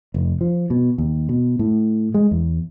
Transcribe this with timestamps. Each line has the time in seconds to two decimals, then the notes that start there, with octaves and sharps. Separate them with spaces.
0.14 F1
0.41 F3
0.70 B2
0.98 D#2
1.29 B2
1.59 A2
2.14 G#3
2.31 E2